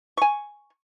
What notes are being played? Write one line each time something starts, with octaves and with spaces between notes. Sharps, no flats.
G#5 C#6